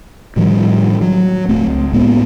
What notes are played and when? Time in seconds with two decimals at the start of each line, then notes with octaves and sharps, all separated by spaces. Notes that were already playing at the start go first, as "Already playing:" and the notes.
0.36 A2 D#3 F3 G3
1.01 F#3
1.48 D1 A3 C4
1.67 C#2
1.93 A2 G#3 A#3 B3